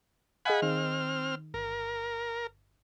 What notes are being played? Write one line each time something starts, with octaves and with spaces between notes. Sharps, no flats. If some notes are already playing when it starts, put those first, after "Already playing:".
G#4 D#5 F5 F#5 G#5 B5
D#3 C4 F6
G1 A#4